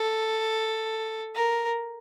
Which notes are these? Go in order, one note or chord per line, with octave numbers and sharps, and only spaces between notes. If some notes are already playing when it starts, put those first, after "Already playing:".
Already playing: A4
A#4